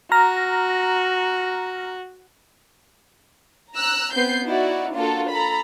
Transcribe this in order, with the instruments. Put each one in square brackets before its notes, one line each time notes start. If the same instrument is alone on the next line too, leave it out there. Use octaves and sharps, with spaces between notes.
[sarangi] F#4 [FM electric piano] A#5 F6 A#6
[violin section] A#5 E6 F#6
B3 C4 G6 C7
D#4 E4 F#4 D5
A#3 D4 F4 F#4 A4
A4 A#5 B5